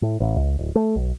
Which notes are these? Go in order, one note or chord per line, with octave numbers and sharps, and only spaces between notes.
A2
A1
C#2
D1
A3
B1